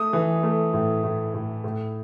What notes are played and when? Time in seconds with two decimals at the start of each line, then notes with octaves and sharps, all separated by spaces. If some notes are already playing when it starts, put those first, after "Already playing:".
Already playing: A3 D#6
0.13 E3
0.43 A3
0.73 A2
1.04 A2
1.34 A2
1.64 A2